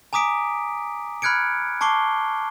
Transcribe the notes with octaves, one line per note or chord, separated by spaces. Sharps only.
G#5 A#5 D6 D#6 B6 D7
B5 F6 F#6 G#6 C#7 D7
A5 C#6 D6 C7 G7